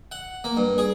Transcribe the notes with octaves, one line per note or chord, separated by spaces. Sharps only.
F#5
A#3
G2
G#4